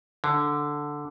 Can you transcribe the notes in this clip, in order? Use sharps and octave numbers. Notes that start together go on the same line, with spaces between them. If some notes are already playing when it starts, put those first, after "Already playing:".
D3